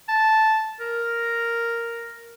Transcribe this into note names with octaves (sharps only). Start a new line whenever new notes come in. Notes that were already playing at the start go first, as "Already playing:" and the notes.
A5
A#4